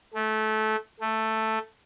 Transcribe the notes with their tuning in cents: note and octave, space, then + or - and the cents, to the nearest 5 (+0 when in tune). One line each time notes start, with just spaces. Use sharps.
A3 -20
A3 +5